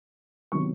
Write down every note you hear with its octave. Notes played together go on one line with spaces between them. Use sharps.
C3 D#3 F#3 B3 C#6